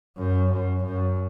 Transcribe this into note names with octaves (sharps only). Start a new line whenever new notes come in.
F#2
F#2
F#2